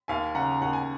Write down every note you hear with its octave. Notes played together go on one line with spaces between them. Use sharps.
D#2 F5 G#5
C#3 F#5 A#5
D#2 F#5
G#5